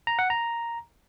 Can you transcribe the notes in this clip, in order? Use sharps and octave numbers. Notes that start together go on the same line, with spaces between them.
A#5
F#5
A#5